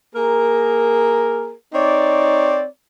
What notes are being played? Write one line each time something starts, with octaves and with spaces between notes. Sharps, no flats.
A#3 G#4 A#4
C4 D#4 C#5 D5